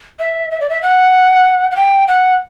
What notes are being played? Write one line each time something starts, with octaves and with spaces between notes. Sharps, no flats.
E5
E5
D5
E5
F#5
F#5
G5
F#5